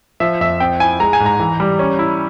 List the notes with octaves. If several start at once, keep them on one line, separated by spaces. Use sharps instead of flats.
F3 E5
F2 E5
C4 G5
E4 G#5
G#3 A#5
G#5
G#2
A#5
E3
G3
C#4
E4